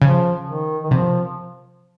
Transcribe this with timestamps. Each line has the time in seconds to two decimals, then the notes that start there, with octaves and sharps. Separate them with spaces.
0.01 C#3 F3
0.46 D#3
0.84 D#3
0.91 C3 F3